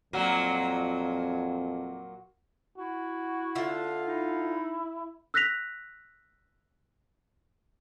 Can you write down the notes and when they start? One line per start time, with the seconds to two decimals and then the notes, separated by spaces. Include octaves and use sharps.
0.13 F2 A#2 F#3 A#3
2.78 E4 F#4
3.55 D3 F4 E5
4.07 D#4 E4
5.34 E6 F#6 A#6 B6 F7